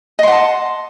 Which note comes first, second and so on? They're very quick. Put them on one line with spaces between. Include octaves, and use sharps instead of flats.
D#5 C6 F#5 A5